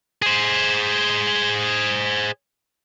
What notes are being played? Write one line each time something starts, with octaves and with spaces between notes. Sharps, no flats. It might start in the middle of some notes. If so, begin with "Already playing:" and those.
G#4 C5